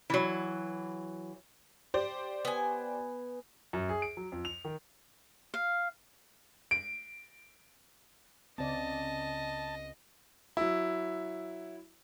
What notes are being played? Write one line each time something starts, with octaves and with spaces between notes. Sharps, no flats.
E3 F#3
G4 C5 D5
B3 G#5
F#2
G#4
D7
F#3
F2
F7
D#3
F5
D7
C#2 C4 D5 D#5 A5
F#3 E4